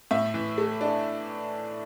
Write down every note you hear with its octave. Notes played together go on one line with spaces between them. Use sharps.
A2 E5
E3
A3
D4